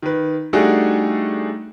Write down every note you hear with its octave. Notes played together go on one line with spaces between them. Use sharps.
D#3 B4
G3 A3 D4 D#4 F#4 G#4